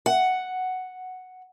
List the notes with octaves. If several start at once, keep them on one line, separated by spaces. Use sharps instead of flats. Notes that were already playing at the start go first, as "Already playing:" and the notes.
F#5